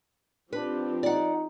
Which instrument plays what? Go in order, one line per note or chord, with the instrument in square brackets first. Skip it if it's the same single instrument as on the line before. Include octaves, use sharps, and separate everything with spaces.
[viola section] F3 C4 G4 [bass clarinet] D4 [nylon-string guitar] B4
[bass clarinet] D#4 [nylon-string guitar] D5 F#5